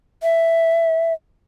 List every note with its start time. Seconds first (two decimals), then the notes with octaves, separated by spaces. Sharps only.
0.23 E5